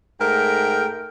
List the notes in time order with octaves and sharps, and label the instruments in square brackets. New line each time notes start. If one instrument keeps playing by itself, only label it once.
[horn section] G#2 A3 A#4 G5